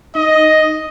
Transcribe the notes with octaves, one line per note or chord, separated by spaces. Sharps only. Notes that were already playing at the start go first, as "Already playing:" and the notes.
D#4 D#5